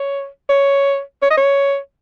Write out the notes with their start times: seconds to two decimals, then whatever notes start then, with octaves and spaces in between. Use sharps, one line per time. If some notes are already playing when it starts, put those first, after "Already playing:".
Already playing: C#5
0.49 C#5
1.22 C#5
1.30 D#5
1.37 C#5